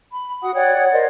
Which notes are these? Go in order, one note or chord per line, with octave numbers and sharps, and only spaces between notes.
B5
F#4 F#5 D#6
C#5 D5 F#5 G5
A#4 C5 D5 D#5